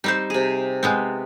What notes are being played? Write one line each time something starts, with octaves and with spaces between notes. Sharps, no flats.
G3 C4 D#4 C5
C3 G#4
G#3 B3 C4